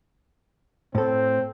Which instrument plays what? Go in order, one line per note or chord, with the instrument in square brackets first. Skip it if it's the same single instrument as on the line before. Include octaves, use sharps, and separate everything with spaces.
[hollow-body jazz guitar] A2 A4 [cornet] C4